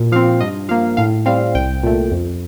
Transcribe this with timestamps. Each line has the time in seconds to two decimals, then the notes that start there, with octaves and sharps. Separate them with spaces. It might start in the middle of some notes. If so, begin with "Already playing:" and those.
Already playing: A#2
0.12 F3 C4 F5
0.40 G2 D#5
0.69 F3 A#3 F5
0.97 A2 F5
1.26 G3 C4 F5
1.55 C2 G5
1.83 A#2 A3
2.11 F2